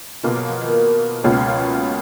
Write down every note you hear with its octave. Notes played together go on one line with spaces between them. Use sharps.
B2 G#3 A#3 F4
F#3
F3
D#3
C#2 B2 G#3 A#3 C#4 F4
F#3
F3
F#3